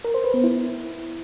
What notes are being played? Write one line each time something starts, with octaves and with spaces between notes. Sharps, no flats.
A#4
C5
B4
B3
E4